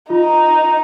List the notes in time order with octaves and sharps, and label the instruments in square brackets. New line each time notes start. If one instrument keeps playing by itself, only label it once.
[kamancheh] D#4 [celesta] F4